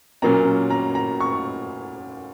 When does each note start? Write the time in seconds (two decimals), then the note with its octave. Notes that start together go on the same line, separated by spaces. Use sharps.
0.22 A#2 F#3 A#3 C#4 A#5
0.70 A#5
0.95 A#5
1.20 C#6